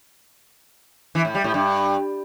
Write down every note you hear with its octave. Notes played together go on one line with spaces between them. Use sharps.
E3
A2
G3
A2
G2